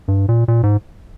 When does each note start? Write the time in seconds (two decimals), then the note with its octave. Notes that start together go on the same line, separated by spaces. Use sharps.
0.08 G2
0.29 A#2
0.48 A#2
0.63 G#2